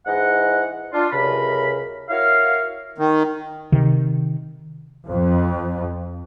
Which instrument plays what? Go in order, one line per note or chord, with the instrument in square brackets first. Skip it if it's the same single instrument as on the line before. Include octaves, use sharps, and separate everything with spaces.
[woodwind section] G#2 E3 D#5 F#5
D4 F4
C#2 F#2 C3 A#4 B5
E4 F#4 A#4 C#5 F5
[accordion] D#3
[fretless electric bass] C3 D#3
[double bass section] F2